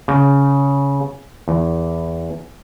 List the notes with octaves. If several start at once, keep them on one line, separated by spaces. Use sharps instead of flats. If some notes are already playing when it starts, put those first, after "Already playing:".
C#3
E2